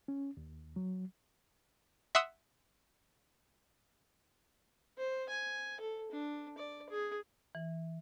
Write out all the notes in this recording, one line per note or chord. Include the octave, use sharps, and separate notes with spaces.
C#4
D#2
F#3
E5 F#5 C6 D#6 E6
C5
G#5
A4
D4
D5
G#4
E3